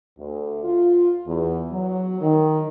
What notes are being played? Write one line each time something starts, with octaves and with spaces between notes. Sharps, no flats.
D2
F4
E2
F#3
D#3